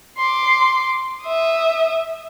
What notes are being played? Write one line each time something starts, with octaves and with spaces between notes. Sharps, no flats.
C6 D6
E5 D#6